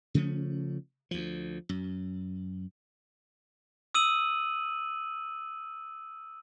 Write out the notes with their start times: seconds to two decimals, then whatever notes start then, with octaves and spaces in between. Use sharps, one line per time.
0.14 C#3 F3 A3 C#4
1.11 D2 F3
1.69 F#2
3.95 D#6 E6 D#7 F#7